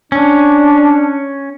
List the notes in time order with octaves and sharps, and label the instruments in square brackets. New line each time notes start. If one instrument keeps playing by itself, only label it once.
[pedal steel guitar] C#4 [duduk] D4